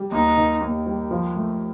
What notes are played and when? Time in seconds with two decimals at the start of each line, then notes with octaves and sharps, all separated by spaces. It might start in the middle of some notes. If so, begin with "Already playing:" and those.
Already playing: G3
0.12 D#2 D#4
0.37 D#3
0.61 D#2
0.86 G3
1.11 F3
1.36 A3